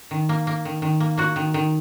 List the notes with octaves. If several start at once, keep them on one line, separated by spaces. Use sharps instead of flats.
D#3
A#3
A#3
D#3
D#3
A#3
A#3 F#4
D#3
D#3